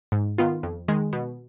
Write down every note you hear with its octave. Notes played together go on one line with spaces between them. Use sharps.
G#2
D#3 B3 F4
F2
D#3 G#3
B2